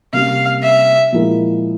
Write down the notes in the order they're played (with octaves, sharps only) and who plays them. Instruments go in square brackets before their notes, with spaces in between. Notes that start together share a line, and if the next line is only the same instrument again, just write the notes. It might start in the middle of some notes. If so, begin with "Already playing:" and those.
[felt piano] C3 G3 A#3 C#4 G4 [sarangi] F5
[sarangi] E5
[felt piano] A#2 F3 G#3 E4 A#4